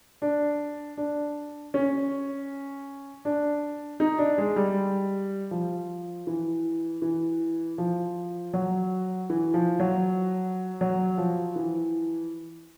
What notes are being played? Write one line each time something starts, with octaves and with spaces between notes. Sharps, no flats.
D4
D4
C#4
D4
D#4
D4
G#3
G3
F3
E3
E3
F3
F#3
E3
F3
F#3
F#3
F3
E3